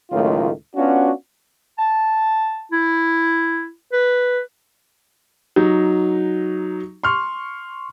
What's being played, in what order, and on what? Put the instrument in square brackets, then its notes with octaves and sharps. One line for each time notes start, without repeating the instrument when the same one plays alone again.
[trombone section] C#2 A2 D#3 F#3 A3 F4
B3 C#4 D4 F4 F#4
[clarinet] A5
E4
B4
[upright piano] F#3 D#4
C6 C#6 F6